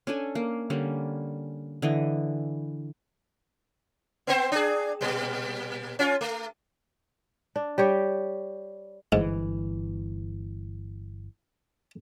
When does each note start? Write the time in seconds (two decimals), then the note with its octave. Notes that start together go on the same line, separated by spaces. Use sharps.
0.07 C#4 D4 A4 G#5
0.35 A#3
0.70 D3 G3 A#3 C#4
1.82 D3 E3 D#5
4.27 B3 C4 C5
4.52 D4 G#4
5.01 A#2 G3
5.99 C#4 F4
6.21 A3
7.56 D4
7.78 G3 G4 C#5
9.12 G1 G#2 E3